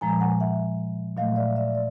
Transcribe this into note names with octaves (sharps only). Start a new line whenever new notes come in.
A#2 F3 G#3 G#5 A#5
F#5 G#5
E5 F#5
A#2 F#3 A3 D#5 F5
D5 E5
D5 E5
D5